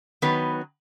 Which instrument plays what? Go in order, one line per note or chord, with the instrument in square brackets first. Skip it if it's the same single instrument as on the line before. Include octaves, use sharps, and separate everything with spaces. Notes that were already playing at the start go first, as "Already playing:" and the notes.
[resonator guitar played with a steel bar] D#3 F#3 B3 B4